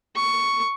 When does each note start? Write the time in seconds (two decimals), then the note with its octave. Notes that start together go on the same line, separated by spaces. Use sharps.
0.16 C#6